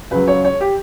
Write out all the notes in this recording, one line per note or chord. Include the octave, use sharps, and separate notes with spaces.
C#2 C#3 F#3 B4
C#5
C#5
G4